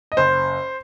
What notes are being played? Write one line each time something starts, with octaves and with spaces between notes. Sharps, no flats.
D#5
F#1 C5